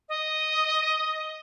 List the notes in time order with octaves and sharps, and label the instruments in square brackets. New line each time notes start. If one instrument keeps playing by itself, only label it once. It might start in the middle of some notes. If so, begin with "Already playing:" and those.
[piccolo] D#5